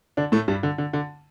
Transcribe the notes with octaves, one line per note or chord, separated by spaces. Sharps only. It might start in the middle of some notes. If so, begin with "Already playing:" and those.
D3 D4
A2 A3
G2 G3
D3
D3
D3